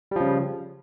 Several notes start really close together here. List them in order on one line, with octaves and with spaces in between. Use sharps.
G3 F3 C#3